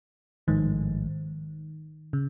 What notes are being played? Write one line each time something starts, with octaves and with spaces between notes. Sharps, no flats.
A1 G#2 D#3 F3 G#3
C#3